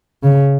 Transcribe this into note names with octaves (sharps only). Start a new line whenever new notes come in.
C#3